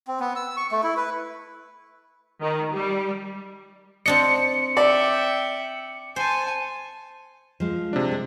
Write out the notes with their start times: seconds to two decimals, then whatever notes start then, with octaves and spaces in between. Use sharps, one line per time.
0.08 C4
0.20 B3
0.36 E6
0.57 C#6
0.71 A3
0.83 E4
0.97 B4
2.41 D#3
2.73 G3
4.06 C4 D4 D#5 C#7
4.77 D5 E5 G5
6.16 C5 G#5 A5
7.60 F3 G#3
7.93 C3 D4
8.12 G#3